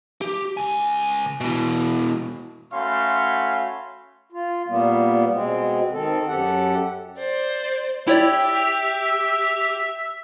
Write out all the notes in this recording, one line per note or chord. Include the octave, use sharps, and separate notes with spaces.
G4
C#2 G#5
B2 E3
A3 C#4 F#4 F5 B5 C6
F4
A#2 G3 A#3 B3
B2 G#3 C4
D#3 C4 A4
F#2 G4 A4 F#5
C5 D5
E4 G4 C#5 D5 E5